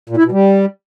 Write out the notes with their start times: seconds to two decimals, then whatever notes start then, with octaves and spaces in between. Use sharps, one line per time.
0.09 A#2
0.17 E4
0.24 B2
0.32 G3